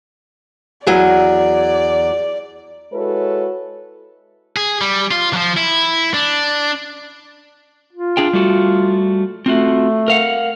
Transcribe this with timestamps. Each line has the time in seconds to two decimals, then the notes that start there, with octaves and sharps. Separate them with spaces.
0.87 E2 F#3 D5 G#5
2.93 G#3 E4 F#4 A4 B4 C#5
4.56 G#4
4.81 G3
5.11 F4
5.33 F3 F#3
5.57 E4
6.14 D4
7.93 F4
8.17 D4 G#4 G5
8.33 G3 A3 F#4
9.46 A3 C4 F4 F#4
10.08 A#4 F5 F#5